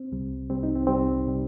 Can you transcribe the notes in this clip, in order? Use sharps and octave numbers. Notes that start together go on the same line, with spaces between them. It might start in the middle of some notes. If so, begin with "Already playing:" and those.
Already playing: C4
C2 C3 G3
C2 C3 G3 C4
D#4
C4
C2 C3 G3 C4
C3 G3